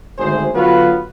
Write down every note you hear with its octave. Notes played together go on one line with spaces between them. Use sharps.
G#1 D2 G#4 C5
D3 F#3 B3 F4 F#4 B4